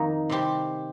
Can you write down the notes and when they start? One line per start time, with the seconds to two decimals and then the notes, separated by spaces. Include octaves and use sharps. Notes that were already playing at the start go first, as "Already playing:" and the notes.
Already playing: F2 D#3 A#3 D#4
0.30 C3 G3 C4 G4